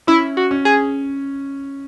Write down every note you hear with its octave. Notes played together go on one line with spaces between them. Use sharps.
C#4 E4
F#4
C#4
G#4